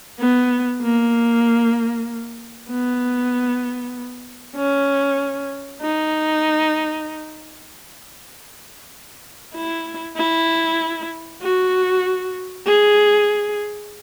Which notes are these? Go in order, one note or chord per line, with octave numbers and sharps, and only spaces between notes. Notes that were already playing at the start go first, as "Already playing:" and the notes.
B3
A#3
B3
C#4
D#4
E4
E4
F#4
G#4